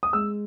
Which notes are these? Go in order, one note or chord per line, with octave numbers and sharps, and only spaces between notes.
D#6
G#3 E6